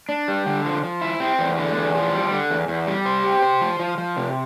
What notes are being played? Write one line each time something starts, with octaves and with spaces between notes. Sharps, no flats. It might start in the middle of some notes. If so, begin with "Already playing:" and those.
D4
G3
D3
F3
F3
E4
C4
E2
D3
E2
F3
G3
D3
E2
E2
G3
C5
G4
C5
F3
F3
F3
C3